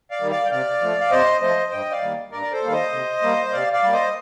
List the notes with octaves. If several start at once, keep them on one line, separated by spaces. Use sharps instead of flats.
D5 F5
D#3 G3 A#3
D5 F5
G5
C3 D5 F5
F3 A3
F5
C3 C5 D#5
F3 A3 C5 D#5
G2 D#5 G5
D5 F5
D#3 G3 A#3
G2 A#4 D5
D5
A4 C5
D#3 G3 A#3 F5
C5 D#5
C3
G3 A#3
D#5
C3 D5 F5
D5 F5
G3 A#3
C5 D#5